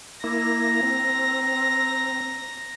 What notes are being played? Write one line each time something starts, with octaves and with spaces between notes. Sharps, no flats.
A#3 E4 A#5 A#6
C4